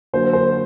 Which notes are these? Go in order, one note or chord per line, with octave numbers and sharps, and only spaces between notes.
D3 F#3 A#3 C5
C5